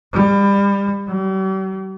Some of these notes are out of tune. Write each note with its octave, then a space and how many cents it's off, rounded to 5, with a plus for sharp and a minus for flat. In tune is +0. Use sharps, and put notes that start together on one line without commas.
G3 +30
G3 -45